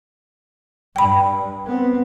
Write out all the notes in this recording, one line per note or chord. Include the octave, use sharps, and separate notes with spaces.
G2 G5 B5
B3 C4